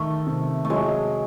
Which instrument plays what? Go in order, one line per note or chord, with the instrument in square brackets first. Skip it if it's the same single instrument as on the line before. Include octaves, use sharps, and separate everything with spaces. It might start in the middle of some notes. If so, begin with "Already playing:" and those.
Already playing: [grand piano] D#3 [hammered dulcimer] A3
[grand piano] C3
[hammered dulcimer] A3
[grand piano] F#3 [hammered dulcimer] G#3